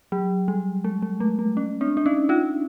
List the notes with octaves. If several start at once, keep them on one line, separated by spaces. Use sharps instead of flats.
F#3
G3
G#3
G#3
A3
A3
C#4
C4 D4
D4
C#4 D#4
D#4 F4